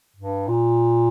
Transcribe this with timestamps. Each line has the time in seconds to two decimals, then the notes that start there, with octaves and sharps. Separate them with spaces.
0.16 G2
0.48 A#2